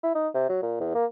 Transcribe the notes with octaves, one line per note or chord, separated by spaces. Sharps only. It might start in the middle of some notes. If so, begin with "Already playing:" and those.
E4
D#4
C3
F#3
A#2
E2
A#3